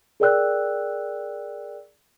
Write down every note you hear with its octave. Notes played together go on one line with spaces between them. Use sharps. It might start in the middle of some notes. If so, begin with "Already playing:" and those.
G#4 A#4 D5 G5 E6 F#6